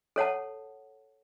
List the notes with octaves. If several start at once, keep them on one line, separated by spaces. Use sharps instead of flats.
A4 C#5 F#5 A5